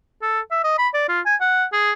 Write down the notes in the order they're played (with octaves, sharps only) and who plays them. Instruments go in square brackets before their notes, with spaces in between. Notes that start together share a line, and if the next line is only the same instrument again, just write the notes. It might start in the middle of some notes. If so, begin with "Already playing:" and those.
[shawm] A4
E5
D#5
B5
D5
F4
G#5
F#5
G#4